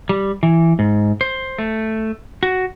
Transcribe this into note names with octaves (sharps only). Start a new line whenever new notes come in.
G3
E3
G#2
C5
A3
F#4